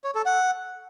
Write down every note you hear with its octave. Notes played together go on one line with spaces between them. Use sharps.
C#5
A4
F#5